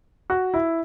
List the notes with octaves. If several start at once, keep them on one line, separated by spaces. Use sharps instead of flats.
F#4
E4